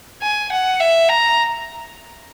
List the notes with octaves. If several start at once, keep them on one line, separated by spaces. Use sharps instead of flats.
G#5
F#5
E5
A#5